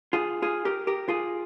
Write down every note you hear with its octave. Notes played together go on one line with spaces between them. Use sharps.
F4 G#4
F4 G#4
G4 A#4
G4 A#4
F4 G#4